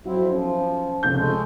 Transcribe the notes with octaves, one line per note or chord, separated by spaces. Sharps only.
F2 F#3 C4 E4
F3 C#4
F1 C#2 G6
G#3 A3